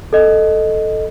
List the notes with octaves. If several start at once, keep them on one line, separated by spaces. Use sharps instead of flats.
A4 D#5